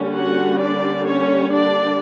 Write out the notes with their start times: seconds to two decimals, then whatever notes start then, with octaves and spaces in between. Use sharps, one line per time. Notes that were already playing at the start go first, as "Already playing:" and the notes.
Already playing: D3 G3 A#3 C#4
0.12 F#4 F#5
0.59 D4 D5
1.06 C#4 C#5
1.52 D4 D5